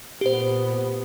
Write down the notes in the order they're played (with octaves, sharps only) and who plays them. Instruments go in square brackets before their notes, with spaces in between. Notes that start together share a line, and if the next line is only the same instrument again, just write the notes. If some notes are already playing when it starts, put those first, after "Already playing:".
[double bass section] A#2 B3 [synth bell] G4 C5